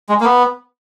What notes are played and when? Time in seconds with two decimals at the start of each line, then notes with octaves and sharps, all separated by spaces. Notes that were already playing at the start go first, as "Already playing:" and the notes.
0.09 G#3
0.20 A#3
0.24 B3